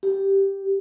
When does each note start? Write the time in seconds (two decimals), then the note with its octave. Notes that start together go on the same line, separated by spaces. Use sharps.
0.03 G4